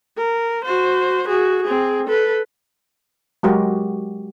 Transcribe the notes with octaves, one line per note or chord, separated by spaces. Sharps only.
A#4
F#4 C5
F#4 G#4
C4 G#4
A4 B4
F#3 G#3 F#4 G4 A#4